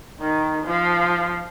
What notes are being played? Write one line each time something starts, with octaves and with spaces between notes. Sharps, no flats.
D#3
F3